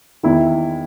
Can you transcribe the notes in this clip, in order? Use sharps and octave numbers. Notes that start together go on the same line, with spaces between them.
E2 D#3 E4